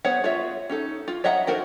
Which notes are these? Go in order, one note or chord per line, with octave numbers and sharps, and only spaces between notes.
B3 G#4 C5 C#5 F#5
F4 F#4 G#4 C#5 E5
C#4 D#4 A4
F4
C#5 D#5 E5 F#5 A#5
D#3 A3 F#4 A#4 C5